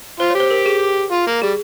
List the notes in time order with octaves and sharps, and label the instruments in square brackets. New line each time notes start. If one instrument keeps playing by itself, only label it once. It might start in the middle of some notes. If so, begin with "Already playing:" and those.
[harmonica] F4 [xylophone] C5
[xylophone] C#5
[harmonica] G4
[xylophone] C5
A#4
G#4
[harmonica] F4
A#3
[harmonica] G3 [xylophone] G#4